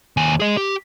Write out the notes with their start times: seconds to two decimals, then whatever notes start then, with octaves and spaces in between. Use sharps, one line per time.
0.17 D#2 G#5
0.40 G#4 D#5
0.57 G4